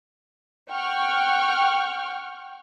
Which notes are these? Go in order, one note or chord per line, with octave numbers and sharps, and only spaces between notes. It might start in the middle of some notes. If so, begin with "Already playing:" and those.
F#5 G5 C#6 F6